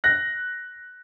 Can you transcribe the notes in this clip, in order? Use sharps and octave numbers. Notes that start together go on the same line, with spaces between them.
F#6 A#6